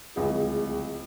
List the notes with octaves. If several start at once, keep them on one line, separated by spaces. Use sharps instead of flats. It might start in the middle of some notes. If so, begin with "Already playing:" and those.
D1 C#2 G#4